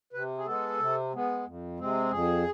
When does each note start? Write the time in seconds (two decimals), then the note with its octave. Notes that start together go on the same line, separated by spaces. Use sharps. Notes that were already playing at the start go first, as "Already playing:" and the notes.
0.13 C3 B4
0.38 G#4
0.46 G#3 B3 A4
0.79 C3
1.13 G#3 B3
1.46 F2
1.79 C3 G#3 C4
2.11 F2 G#4